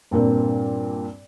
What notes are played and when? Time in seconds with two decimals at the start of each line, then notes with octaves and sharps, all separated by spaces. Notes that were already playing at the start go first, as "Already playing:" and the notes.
0.11 G2 A#2 A#3 C4